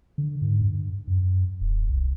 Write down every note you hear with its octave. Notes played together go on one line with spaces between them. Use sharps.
D3
G#2
G2
F#2
D#1
C2